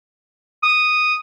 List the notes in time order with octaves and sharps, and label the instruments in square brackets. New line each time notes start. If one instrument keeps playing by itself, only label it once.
[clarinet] D#6